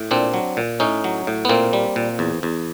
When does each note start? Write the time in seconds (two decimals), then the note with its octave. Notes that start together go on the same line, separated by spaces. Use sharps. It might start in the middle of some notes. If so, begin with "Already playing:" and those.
Already playing: A2
0.11 A#2 C4 D4
0.34 F#3
0.57 A#2
0.80 A2 C#4 D#4
1.04 F#3
1.27 A2
1.45 B3
1.49 A#2 A#3 C4
1.73 G3
1.96 A#2
2.19 E2
2.43 E2